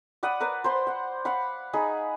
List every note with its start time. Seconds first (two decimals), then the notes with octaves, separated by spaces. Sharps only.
0.23 D5 F#5 B5 D#6
0.40 A#4 B4 D5
0.64 C5 B5 C6
0.87 F#5
1.25 F5 F#5 B5
1.73 D#4 G#4 B5